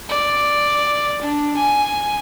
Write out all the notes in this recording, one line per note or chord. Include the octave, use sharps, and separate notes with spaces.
D5
D4
G#5